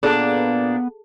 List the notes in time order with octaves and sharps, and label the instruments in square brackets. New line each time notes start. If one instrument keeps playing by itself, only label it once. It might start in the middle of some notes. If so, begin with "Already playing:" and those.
[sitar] A#2 D4 [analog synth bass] B3 [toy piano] G#4 A4 A5